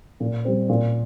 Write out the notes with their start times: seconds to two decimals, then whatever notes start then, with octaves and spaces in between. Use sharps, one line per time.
0.20 A#2
0.45 G3 C4
0.69 A#2